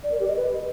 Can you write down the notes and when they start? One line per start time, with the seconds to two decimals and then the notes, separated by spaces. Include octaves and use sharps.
0.04 D5
0.12 A#4
0.20 G4
0.28 D#5
0.36 B4